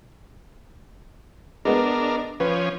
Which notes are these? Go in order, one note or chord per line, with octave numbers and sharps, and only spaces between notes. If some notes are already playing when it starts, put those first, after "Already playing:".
G#3 B3 D4 A#4
F3 C#4 B4